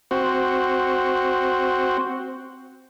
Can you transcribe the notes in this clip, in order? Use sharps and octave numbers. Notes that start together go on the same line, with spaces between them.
C4 F#4